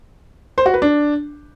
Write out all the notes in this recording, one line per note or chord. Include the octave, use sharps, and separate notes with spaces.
C5
F#4
B4
D4